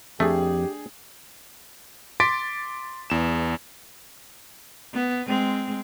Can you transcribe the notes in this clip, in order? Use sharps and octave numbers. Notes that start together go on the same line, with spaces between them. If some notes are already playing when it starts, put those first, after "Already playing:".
F2 A3 D4 G4 G#4 G5
C6 D6 A6 B6 D7
E2 E7
B3
G#3 C4